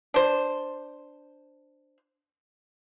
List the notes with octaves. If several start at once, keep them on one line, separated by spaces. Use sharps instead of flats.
D4 C5